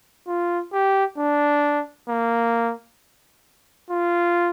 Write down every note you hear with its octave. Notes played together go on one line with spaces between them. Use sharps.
F4
G4
D4
A#3
F4